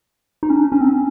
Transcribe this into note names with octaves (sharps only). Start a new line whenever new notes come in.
D#4
C#4
D4
C#4
C4
C#4